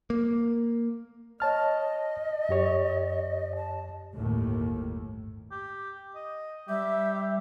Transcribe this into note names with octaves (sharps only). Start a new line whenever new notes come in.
A#3
C#5 D#5 A5 F6
F#2 G4 C#5
A5
G1 D#2 A2
G4
D#5
G3 G4 E5